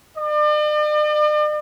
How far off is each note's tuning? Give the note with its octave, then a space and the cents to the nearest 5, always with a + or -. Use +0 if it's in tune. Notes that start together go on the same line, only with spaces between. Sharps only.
D5 +45